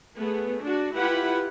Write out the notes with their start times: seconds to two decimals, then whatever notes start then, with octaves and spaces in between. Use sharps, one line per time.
0.17 A3 B3 G#4
0.63 D4 F#4
0.96 E4 F4 G4 B4 F#5 B5